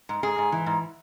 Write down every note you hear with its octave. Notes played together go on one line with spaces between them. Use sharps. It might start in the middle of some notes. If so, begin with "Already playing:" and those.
G#2
G#2 G#4
G#2
E3
G#2